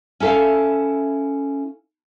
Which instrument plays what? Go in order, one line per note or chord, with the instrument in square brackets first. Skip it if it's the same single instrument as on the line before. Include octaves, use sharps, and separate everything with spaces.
[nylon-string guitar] C#4 E4 A4 E5 F5